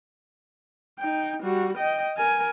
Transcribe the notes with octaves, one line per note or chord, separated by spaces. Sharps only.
D#4 G5
G3 F#4
D#5 G5
A#4 G#5